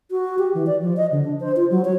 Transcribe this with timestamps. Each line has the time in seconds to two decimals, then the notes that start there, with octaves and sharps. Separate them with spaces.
0.11 F#4
0.39 G4
0.55 E3
0.67 D5
0.81 F3
0.97 D#5
1.12 D3
1.25 D4
1.40 C5
1.56 F4
1.71 F#3
1.85 C#5